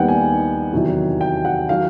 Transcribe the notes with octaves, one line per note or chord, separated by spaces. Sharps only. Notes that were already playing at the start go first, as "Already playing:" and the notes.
Already playing: D#2 D#3 G3 B3 F#5 G5
G#5
E2 C3 D#3 F#3
G5
F#5
D#3 F#3 F5